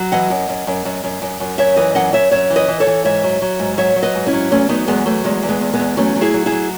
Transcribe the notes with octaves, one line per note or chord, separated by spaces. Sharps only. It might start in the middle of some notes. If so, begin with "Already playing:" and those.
Already playing: F#3
E3 D#5 F#5
F#2
F#2
F#2
F#2
F#2
F#2
F#2
F#2 C#5 E5
E3 B4 D#5
F#2 D#5 F#5
F#2 C#5 E5
F#2 C#5 E5
E3
B4 D#5
E3
A4 C#5
E3
G#2 C#5 E5
F#3
F#3
G#2
F#3 C#5 E5
F#3
B4 D#5
G#2
C#4 E4
F#3
E2 A3 C#4
F#3 B3 D#4
E2 G#3 B3
F#3 A3
E2 G#3
E2
G#3 B3
E2
G#3 B3
E2
F#3 A3 C#4
F#3
E4 G#4
F#3
E4 G#4
F#3